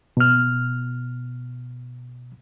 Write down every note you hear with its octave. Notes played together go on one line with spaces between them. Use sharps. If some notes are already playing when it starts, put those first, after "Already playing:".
B2 F6